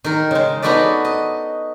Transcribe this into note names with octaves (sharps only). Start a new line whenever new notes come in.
D#3 A#4
C#3 G#3
B3 D#4 F#4 A4 B4 D5
D#5